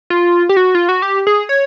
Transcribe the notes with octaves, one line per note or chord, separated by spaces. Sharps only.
F4
G4
F#4
F4
F#4
G4
G#4
C#5